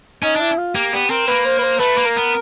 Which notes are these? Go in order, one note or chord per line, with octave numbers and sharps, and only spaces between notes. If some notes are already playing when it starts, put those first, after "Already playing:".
C#4 D#4
D4 E4
F4
A#3 G4
B3 G4
C4 A#4
A#3 B4
C5
B4
C5
A3 B4
A#3
A#4
B3